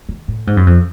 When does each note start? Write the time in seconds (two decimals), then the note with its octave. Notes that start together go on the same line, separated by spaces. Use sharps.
0.09 D#3
0.28 A2
0.47 G#2
0.57 F#2
0.66 F2